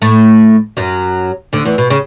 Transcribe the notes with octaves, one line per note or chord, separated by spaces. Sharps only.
A2 A3
F#2 F#3
D2 D3
E2 E3
B2
C#3